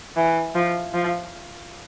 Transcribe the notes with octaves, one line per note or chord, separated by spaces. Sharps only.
E3
F3
F3